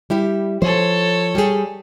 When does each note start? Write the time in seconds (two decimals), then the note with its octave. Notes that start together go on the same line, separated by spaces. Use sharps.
0.10 G3 E4 G4
0.62 F3 A4 C5 C#5
1.35 G3 G4 G#4